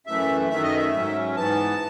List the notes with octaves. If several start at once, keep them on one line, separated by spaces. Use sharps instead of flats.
F#2 E3 A3 E5
F#2 D#3 A3 E5
D#5
E5
G#2 F#3 C#4
G#2 E3 B3 A5